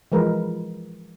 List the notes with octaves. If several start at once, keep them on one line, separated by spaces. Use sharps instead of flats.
E3 F3 G#3 A#4 B4